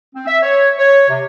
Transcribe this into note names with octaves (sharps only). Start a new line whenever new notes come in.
C4
E5
C#5
C#5
C3